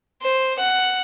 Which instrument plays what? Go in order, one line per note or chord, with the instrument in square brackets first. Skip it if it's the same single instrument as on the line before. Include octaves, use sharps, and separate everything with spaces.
[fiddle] C5
F#5